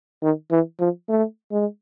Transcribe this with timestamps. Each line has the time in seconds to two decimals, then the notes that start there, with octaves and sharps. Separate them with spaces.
0.22 D#3
0.51 E3
0.79 F3
1.09 A3
1.52 G#3